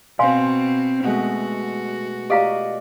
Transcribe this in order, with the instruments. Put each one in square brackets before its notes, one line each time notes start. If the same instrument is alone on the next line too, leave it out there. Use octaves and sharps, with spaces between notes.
[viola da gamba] B2 C4 [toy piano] F5 G#5 C6
[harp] B2 G#3 A3 [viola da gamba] F#4
[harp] F4 D5 D#5 [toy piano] G4 F5 A#5